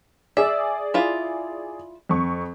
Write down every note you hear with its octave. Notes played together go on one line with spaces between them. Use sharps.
G#4 D5 E5
E4 F4
F2 C#6